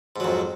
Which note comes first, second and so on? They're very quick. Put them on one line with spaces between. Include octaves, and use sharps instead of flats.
G#2 F#3 F2